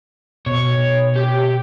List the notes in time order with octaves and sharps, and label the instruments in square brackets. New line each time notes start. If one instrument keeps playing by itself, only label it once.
[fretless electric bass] B2 [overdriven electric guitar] C#5
[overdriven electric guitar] G4